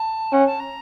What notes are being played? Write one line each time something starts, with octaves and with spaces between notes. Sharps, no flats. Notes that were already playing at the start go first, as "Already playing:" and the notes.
Already playing: A5
C#4 F#5
A5
A#5